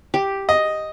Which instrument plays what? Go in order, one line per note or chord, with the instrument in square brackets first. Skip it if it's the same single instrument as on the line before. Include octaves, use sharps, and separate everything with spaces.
[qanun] G4
[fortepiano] D#5